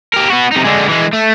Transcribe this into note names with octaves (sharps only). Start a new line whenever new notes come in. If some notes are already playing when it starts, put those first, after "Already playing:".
G4 A#4
B3 F#4
C3 D#4
D3 G#3
E3 G#3
A3